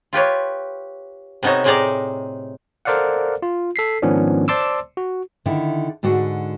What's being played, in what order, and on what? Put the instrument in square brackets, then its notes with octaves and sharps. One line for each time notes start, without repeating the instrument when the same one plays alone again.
[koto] F4 G4 B4 C#5
C3 B3 D#4 A4 C#5
A2 C4 D#4 G#4 D5 A#5
[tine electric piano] A4 A#4 C5 D5 F5 F#5
F4
A4 B6 C7
G#2 D#3 F3 B3 C#4 D4
C5 D5 A5 C6 D6 E6
F#4
[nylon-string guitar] D3 D#3 E4
G#2 D3 D4 F#4